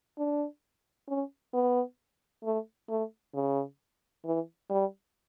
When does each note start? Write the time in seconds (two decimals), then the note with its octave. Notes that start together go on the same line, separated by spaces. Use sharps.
0.18 D4
1.08 C#4
1.54 B3
2.44 A3
2.89 A3
3.34 C#3
4.25 E3
4.70 G3